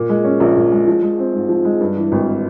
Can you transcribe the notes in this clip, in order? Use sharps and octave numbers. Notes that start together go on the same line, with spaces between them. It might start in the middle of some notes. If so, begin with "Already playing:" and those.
Already playing: A#2
G#3
C#4
A#1
A#2
G#3
F3
G#3
C4
G#2
F3
G#3
G2
E3
G#1